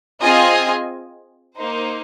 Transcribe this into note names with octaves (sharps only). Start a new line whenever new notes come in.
C4 F4 G#4 D#5 G#5
A#3 D#4 C5